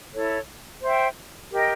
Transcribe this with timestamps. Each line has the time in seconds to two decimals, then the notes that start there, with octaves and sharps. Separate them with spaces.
0.14 E4 A4 C#5
0.82 C5 E5 G5
1.51 G4 A#4 D#5 G5